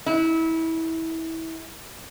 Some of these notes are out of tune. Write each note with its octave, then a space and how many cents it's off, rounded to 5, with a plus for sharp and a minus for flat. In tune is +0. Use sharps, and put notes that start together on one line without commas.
E4 -25